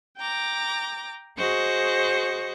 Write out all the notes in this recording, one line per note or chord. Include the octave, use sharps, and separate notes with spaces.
G5 A#5 D6
F#4 G#4 C5 D#5 C#6